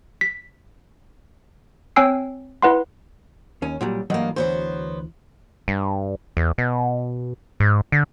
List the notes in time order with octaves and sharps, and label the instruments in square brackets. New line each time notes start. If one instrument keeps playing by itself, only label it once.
[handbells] B6
C4 C#5 G5 G#5 E6 C7
E4 B4 F#5 C6
[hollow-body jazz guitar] D#2 C#4
A#2 F#3 G3
[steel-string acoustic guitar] G2 A#3 [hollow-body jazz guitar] E3 F#3 D#5
[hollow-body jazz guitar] D2 E3 [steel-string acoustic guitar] F#3 B3 C5
[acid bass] G2
E2
B2
G#2
D3